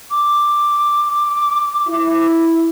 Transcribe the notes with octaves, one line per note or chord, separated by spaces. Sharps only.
D6
E4